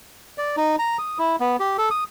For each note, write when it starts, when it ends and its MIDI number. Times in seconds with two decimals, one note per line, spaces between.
0.38 0.56 74
0.57 0.76 63
0.79 0.98 82
0.99 1.18 87
1.18 1.36 64
1.40 1.56 59
1.60 1.77 67
1.78 1.89 69
1.91 2.04 87